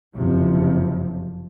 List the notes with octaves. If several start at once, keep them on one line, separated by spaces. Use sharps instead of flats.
F#1 F2 C3 F3